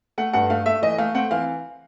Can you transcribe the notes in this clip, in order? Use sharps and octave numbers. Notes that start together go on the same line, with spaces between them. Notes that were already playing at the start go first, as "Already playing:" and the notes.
A3 F#5
G2 F#5
A3 F5
A3 E5
E3 D#5
A3 F5
C4 F#5
E3 F5